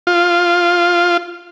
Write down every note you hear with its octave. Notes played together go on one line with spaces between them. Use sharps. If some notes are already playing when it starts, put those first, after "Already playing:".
F4